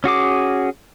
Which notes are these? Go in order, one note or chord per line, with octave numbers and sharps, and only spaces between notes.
C#4 F#4 G#4 D6